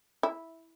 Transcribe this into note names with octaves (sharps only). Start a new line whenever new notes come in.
E4